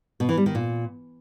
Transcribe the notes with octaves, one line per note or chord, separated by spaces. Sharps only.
B2
E3
G3
D#3
A#2